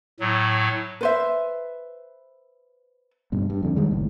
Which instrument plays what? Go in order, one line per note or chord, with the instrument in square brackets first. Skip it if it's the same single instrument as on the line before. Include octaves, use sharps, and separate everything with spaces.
[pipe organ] A2 F#3
[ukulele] B4 C5 E5
[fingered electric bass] G2 B2
G2
F2 D3
D#3 G3 G#3
F#1 B1 A2